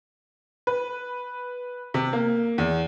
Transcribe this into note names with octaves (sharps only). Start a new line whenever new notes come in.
B4
C3
A#3
E2